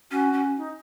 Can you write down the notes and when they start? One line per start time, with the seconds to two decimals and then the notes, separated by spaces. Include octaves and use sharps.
0.11 C#4 F#4
0.33 C#4
0.57 D#4